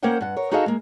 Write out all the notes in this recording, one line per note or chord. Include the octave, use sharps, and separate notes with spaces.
A#3 C#4 A#4 C5 F#5 G5
G2 F#5
A#4 C#5
D#4 F#4 G#4 A4 D#5 F5
G#3 A#3